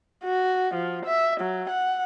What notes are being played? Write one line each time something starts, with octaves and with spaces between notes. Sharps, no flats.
F#4
F3
E5
F#3
F#5